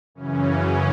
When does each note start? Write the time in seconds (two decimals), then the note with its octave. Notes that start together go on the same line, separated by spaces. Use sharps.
0.15 F#2 C#3 E3 C#4
0.49 C#4